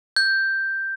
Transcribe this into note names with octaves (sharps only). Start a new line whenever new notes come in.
G6